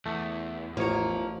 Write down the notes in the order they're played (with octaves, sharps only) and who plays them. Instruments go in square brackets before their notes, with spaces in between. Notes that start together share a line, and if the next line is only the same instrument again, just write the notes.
[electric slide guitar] E2 [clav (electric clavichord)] A3
[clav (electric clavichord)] A1 C#5 [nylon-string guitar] F3 [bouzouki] A#3 A#4